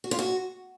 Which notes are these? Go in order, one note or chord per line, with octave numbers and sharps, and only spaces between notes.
F#4
F4
F#4